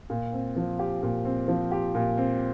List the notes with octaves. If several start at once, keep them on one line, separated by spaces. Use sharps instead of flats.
A#2
C4
F3
G4
A#2
C4
F3
G4
A#2
C4